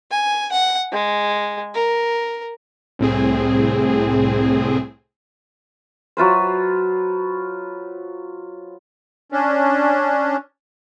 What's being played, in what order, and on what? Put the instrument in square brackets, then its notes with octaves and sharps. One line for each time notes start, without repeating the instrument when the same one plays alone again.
[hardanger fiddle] G#5
F#5
G#3
A#4
[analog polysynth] C2 A2 C4 G#4
[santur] F#3 F4 B4 C5
[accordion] C#4 D4